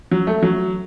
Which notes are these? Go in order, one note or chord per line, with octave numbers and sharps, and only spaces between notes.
F#3
A3
F#3